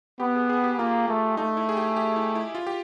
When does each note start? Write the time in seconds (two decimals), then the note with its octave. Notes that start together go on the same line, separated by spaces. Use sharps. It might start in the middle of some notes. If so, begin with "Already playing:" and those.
0.20 B3 G4
0.35 G#4
0.49 G#4
0.64 G4
0.78 A#3 F4
1.08 A3
1.37 A3 D#4
1.57 E4
1.69 G#4
1.77 G4
1.96 G4
2.16 E4
2.35 E4
2.55 F4
2.67 G4